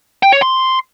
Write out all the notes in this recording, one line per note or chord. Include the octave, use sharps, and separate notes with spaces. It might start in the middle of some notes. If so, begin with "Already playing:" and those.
G5
C#5
C6